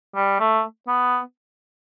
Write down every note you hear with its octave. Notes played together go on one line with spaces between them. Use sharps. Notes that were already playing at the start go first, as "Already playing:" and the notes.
G3
A3
B3